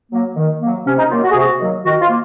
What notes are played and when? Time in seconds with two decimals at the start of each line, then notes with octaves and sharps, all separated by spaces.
0.12 F#3 A#3
0.36 D#3
0.61 F#3 A#3
0.86 C3 C#4
0.98 D#4
1.10 D#3 F#3 A#3 F4
1.24 F#4
1.31 G#4
1.35 C3 F#4
1.59 D#3 F#3 A#3
1.85 D#3 F#4
2.01 F4
2.09 A#3